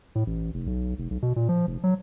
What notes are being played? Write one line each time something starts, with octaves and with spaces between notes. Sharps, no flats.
A2
A1
F1
B1
F1
B1
B2
A#2
F3
F1
F#3